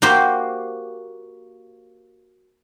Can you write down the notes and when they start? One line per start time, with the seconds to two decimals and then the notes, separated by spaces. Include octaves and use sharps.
0.02 A#3 F#4 G4 C5